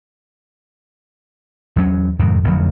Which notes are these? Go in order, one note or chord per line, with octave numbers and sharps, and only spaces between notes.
E2 F#3 C#4
F2 G#2 C3 D#3
A1 F2 D3 F#3